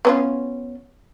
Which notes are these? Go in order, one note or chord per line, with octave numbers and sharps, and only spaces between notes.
B3 C#4 F4